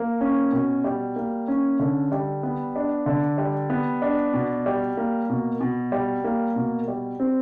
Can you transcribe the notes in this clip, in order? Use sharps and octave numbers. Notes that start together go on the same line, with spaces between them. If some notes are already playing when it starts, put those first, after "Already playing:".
Already playing: A#3
C#4
B2
G3
A#3
C#4
D3
G3
B3
D4
D3
G3
B3
D4
B2
G3
A#3
B2
B2
G3
A#3
B2
G3
C4